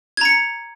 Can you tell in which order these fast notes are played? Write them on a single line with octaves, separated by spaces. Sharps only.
G#6 A#5 C#7